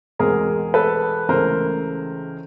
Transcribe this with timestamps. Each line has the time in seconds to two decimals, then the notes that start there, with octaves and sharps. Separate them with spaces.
0.19 E2 B2 G#3 C4 G#4 A#4
0.74 A4 B4
1.29 C#2 C#3 E3 A3 A#4 C5